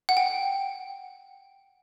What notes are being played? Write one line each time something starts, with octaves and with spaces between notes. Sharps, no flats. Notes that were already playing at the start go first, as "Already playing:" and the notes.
F#5
G5